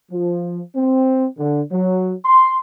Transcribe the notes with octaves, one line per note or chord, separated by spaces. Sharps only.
F3
C4
D3
F#3
C6